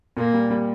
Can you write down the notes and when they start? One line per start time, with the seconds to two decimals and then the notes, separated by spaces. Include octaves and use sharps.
0.17 A#2 A#3
0.33 G3
0.50 G3